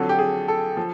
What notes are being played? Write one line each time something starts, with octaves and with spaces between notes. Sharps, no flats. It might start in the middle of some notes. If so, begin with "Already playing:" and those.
Already playing: F2 D3 F#3 A4
G4
G#4
A4
F3